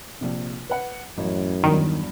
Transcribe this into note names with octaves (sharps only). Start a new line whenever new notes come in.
A#1 C3
B4 F#5
A1 F#2
E2 G2 D#3 F#3